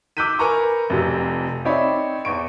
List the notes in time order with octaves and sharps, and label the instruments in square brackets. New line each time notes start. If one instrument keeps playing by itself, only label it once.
[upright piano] D6 E6 F#6 G6 B6 D#7
A#4 B4 G#5 A#5 C#6
F1 F2 C3
C4 D#4 C#5 D5 E5 B5
E2 C#6 D7